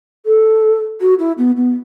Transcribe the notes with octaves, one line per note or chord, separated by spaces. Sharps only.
A4
F#4
E4
B3
B3